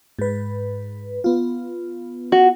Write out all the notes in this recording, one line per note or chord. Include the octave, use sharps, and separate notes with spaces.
G#2 B4
B3 F4
F#4